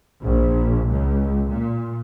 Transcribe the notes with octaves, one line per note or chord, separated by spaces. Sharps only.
A#1
C#2
A#2